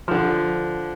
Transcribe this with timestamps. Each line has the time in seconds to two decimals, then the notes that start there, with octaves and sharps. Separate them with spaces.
0.08 D3 F3